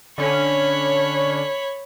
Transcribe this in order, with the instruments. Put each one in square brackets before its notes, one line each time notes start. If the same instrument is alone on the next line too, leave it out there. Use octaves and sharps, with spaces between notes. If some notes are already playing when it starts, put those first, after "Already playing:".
[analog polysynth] D3 C#4 [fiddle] C#5 B5